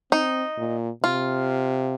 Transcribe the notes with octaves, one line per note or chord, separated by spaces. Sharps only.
C4 D#4
A#2
C3 F4